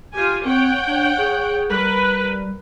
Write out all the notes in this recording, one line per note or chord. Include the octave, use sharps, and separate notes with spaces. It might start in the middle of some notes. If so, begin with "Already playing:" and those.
F4 G4 G#5
C4 C#5 F#5 G5
D4
G#4
G3 A#4 B4